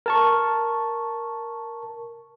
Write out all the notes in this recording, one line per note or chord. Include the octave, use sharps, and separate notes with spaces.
A#4 A5 C#6